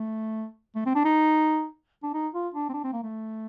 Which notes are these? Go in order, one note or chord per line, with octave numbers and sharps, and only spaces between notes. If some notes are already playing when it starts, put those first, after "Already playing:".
Already playing: A3
A3
C4
D4
D#4
D4
D#4
F4
D4
C4
D4
C4
A#3
A3